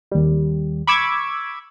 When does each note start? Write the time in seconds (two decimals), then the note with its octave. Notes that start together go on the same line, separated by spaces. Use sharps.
0.12 D#2 G3
0.87 B5 C#6 D6 E6 G#6